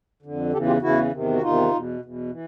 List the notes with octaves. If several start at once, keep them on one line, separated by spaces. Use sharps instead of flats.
F2 D3
E2 C#3 E3 G4 A4
F4 G4
E2 C#3 E3 E4 F#4
E2 C3 D#3
F#4
E2 C3 D#3 D#4 F4
E2 B2
E2 B2
E3